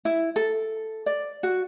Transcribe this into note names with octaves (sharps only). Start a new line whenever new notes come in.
E4
A4
D5
F#4